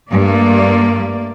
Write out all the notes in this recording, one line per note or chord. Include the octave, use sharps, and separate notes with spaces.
G2 A3 A#3 D5